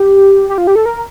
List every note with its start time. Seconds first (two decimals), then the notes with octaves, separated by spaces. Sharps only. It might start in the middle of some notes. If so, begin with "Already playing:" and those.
Already playing: G4
0.49 G4
0.58 F4
0.67 G4
0.76 A4
0.86 A#4